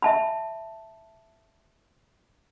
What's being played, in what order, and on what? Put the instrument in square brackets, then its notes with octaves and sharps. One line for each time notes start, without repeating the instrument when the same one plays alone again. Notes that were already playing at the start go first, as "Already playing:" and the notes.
[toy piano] E5 A5 B5